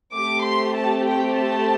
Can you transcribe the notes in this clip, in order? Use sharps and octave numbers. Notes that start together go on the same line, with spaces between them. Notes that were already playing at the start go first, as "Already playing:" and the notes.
A3 C4 G4 D6
C6
A5
G5
A5